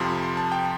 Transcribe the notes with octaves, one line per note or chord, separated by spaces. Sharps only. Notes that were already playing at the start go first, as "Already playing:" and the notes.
Already playing: F2 C3 F3 C6
C6
A5
G5